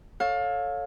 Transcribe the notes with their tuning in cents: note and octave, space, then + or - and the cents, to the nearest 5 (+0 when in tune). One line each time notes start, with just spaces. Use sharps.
A4 +5 C#5 +0 F5 +25